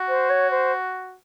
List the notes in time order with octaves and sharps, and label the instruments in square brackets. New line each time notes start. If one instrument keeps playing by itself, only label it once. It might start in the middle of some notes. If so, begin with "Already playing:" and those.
Already playing: [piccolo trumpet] F#4
[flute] C5
C#5
C5